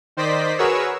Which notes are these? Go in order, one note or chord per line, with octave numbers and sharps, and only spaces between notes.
D#3 C5 D5 D#5 B6
F#4 G#4 A#4 B4 C#5 E6